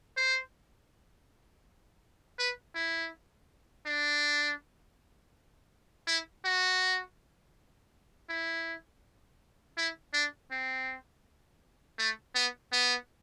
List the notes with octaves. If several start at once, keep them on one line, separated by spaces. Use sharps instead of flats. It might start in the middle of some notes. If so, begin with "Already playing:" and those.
C5
B4
E4
D4
E4
F#4
E4
E4
D4
C4
A3
B3
B3